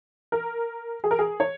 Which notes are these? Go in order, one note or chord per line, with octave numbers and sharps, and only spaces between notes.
A#4
G#4
A#4
G#4
C#5